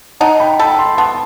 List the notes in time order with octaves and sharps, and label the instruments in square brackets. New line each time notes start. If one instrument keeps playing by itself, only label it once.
[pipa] D#4 [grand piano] F#5 A5
[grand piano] G5 B5
[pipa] A4 [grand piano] G5 B5
[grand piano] A5 C6
[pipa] B3 [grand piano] A5 C6